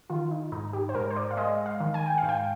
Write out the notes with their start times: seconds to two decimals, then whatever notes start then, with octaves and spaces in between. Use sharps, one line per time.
0.10 D#3 F4
0.31 D#4
0.52 G#2 D#4
0.73 G4
0.89 C5
0.95 G#2 A#4
1.10 C5
1.16 D5
1.31 F5
1.37 G#3 D#5
1.66 F5
1.80 D#3
1.94 G#5
2.06 G5
2.18 G#2 F5
2.29 G5